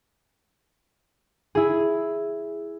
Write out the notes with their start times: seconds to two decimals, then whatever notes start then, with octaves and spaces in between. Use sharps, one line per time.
1.55 E4 G#4